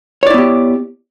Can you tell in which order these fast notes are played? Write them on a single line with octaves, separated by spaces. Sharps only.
C#5 D5 E4 B3 G4